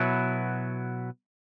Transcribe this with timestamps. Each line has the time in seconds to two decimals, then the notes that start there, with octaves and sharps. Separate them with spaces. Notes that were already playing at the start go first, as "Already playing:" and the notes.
Already playing: B2 F#3 B3 E4